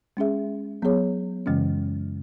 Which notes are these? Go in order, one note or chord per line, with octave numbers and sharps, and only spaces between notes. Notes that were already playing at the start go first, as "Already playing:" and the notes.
G#3 C#4 G#4 E5
F#3 B3 G#4 C#5
F#2 C#3 E3 G#3 C#4